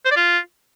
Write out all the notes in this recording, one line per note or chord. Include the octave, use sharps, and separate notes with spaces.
C5
D5
F4